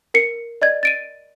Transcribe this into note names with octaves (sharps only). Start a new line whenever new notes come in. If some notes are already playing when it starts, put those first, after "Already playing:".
A#4 C7 C#7
D5 D#5 G#6
A6 D7 D#7